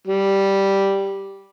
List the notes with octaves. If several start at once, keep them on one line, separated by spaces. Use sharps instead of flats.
G3